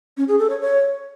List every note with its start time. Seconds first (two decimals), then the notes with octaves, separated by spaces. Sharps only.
0.17 C#4
0.28 G#4
0.39 A4
0.50 C#5
0.61 C#5